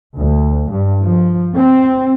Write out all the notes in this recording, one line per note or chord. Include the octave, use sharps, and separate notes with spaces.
D2
G2
F3
C4